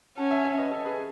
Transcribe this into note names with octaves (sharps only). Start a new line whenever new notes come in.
C#4 F#5 A5
E5 G#5
E5 G#5
B4 D#5
A4
G#4 B4